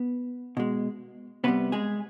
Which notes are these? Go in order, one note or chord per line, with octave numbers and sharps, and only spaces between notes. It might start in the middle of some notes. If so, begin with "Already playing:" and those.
Already playing: B3
B2 G#3
C3 G3 B3 B4
G#3 G#4